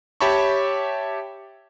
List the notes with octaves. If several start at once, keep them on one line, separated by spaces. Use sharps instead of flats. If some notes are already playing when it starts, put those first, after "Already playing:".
G4 C#5 E5 A5 B5 C#6